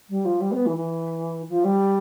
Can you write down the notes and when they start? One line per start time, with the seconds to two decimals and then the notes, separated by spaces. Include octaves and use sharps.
0.10 G3
0.25 F3
0.41 G3
0.51 C4
0.55 B3
0.66 E3
0.76 E3
1.49 F3
1.64 G3